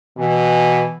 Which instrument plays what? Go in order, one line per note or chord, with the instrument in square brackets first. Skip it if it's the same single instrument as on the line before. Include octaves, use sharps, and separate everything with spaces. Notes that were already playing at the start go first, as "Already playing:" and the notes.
[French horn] B2 [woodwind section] E3